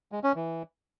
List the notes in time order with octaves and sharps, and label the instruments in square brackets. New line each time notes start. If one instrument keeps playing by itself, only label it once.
[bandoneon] G#3
C#4
E3